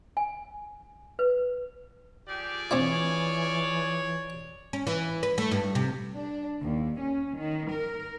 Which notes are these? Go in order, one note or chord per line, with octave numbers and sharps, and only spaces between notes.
G#5
B4
F3 G4 G#4 D5
E3 C4 D4 E4 C#5
C#4
E3
B4
A3
G2
C3
D4
D#2
C#4
D#3
A#4